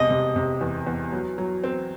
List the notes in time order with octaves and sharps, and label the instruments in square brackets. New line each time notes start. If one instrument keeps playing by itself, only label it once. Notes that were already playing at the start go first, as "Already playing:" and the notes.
Already playing: [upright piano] E1 C3 [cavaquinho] D#5
[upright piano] C3
C3
E2
E2
F#3
F#3
C4